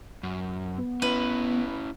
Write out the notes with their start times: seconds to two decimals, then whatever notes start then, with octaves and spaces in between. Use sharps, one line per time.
0.23 F#2
0.78 B3
1.02 C#4 E4 B4